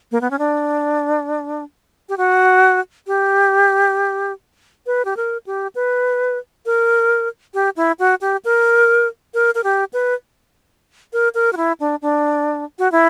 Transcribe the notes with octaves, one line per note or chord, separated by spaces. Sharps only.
A#3
B3
C#4
D4
G4
F#4
G4
B4
G4
A#4
G4
B4
A#4
G4
E4
F#4
G4
A#4
A#4
A#4
G4
B4
A#4
A#4
F#4
E4
D4
D4
F#4
E4